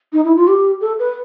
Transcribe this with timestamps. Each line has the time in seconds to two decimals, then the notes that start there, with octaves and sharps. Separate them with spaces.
0.13 D#4
0.24 E4
0.36 F4
0.47 G4
0.81 A4
0.99 B4